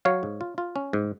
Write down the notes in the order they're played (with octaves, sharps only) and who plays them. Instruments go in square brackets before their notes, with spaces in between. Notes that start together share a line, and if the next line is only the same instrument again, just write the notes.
[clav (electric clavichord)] F#3 C#5 F5
G#2
F4
F4
C#4
G#2